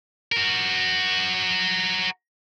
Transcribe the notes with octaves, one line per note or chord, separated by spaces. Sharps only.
F#4 A#4